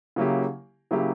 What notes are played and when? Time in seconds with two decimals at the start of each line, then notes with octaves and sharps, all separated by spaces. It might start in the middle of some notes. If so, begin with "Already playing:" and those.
0.16 C#3 F#3 A#3 E4 G4
0.91 C#3 F#3 A#3 E4 G4